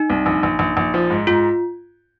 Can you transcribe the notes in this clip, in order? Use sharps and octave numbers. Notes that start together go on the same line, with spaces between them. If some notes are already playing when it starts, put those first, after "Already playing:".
Already playing: D#4
C2
A#1
A#1
A#1
A#1
F3
G#2
G#2 F4